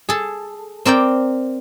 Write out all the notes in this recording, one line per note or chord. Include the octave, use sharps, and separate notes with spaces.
G#4 A4
C4 A#4 D5 G5